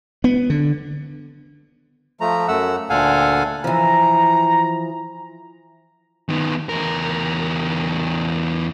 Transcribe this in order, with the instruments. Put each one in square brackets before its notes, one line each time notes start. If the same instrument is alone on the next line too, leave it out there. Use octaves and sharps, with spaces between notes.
[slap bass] B3
D3
[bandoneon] F3 A3 A#5
F#2 A3 F#5 E6
D2 A#2 A4 F5 F#5 G#5
[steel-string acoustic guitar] E3 F3 [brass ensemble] A#5
[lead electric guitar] D#3 B3
E2 A#4